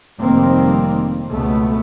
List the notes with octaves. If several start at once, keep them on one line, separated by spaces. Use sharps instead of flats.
F1 F2 D#3 G3 A#3 C4
C#2 B2 A3 B3